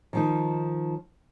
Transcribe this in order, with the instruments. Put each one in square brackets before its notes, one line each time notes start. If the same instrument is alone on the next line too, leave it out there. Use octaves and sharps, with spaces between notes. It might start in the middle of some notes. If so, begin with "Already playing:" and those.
[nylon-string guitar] D#3 F3 D#4